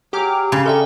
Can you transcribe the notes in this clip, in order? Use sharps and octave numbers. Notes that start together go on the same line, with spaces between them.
F#3 G4 G#4 D6 F6
C#3 B5 C6
D4 A4 A#4 D#5 E5 G5